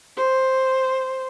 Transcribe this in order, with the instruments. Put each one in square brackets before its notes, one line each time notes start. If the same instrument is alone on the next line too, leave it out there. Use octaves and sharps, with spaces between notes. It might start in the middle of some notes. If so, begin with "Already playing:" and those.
[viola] C5